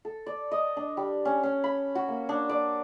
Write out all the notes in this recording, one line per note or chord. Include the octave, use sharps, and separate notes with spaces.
A4
D5
D#5
D4
G3
C#4
C#4
B5
F#4
A#3
D4
D5